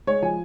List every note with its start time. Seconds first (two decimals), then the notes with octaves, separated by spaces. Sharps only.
0.07 G#3 C#5
0.22 F3 G#5